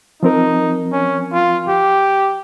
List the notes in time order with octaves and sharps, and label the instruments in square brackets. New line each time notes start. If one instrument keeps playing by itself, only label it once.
[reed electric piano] F3 C4 A#4 [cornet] D#4
[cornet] C#4
F4
G4